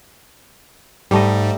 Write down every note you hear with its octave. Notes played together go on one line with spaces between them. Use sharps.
G#2 G3 A3 D#5